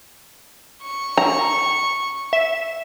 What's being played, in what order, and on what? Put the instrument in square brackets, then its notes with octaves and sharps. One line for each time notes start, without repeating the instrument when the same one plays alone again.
[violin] C#6
[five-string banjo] A#5
[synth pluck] E5